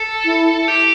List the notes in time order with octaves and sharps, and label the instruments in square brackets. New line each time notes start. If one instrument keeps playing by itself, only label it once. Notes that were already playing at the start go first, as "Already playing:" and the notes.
Already playing: [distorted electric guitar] A4
[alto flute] E4
[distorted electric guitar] G4